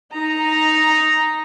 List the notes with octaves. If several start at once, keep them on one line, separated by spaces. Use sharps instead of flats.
D#4 A#5